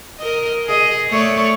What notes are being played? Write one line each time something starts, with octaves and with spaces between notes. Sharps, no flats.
A#4 D#5
G#4 D#5
A3 C#5 D5